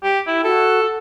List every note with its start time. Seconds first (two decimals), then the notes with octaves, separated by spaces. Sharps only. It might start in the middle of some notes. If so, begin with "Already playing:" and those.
0.03 G4
0.27 E4
0.44 F#4 A4